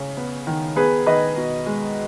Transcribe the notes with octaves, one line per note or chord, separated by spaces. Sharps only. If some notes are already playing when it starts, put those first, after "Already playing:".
Already playing: C#3
B3
D#3
B3 G#4 B4
D#3 B4 D#5
B2
G#3